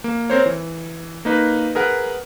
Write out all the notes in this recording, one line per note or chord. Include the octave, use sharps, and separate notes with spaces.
A#3
C4 A#4 C5 C#5
E3
A#3 D#4 B4
G#4 A#4 B4 F#5